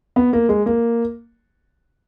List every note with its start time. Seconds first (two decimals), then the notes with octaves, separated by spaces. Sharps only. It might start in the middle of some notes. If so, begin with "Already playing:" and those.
0.16 B3
0.33 A#3
0.49 G#3
0.66 A#3